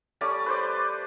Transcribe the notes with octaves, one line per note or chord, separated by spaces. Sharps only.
G3 A3 C#4 D5
B4 C5 D5